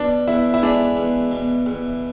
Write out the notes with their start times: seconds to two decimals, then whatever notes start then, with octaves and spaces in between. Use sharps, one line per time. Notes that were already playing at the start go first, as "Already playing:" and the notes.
Already playing: B2 D4
0.28 E2 E4
0.54 E4
0.62 G#3 D4
0.97 E2
1.32 B2
1.66 E2